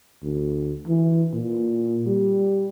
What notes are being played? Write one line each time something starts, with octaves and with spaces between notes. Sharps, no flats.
D2
E3
A#2
G3